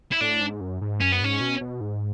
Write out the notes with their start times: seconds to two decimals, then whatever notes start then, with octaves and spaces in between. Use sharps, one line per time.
0.12 E4
0.21 A2 D4
0.41 G#2
0.61 F#2
0.81 G#2
1.01 F#2 C#4
1.12 B3
1.21 G#2 C#4
1.41 B2
1.61 B2
1.81 G#2